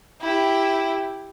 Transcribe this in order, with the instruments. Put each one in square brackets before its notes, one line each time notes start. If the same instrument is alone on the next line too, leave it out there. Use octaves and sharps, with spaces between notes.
[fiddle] E4 G4